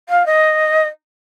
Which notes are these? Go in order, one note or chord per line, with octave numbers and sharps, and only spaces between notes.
F5
D#5